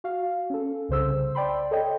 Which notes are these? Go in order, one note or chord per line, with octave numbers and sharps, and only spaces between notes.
F#4 F5
C#4 A4
C2 C#3 C5 E6
D5 G5 B5 C6
A4 C#5 D#5 G5